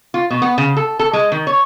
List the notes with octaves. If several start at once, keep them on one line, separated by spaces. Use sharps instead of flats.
F4
B2
B3
C#3
A4
A4
G#3
D#3
C#5